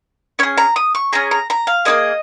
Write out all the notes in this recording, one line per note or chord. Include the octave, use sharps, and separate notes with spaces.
C#4 G#4 C#5
A#5
D#6
C#6
C#4 G#4 A#5
A#5
A#5
F5
A#3 C#4 G#4 D#5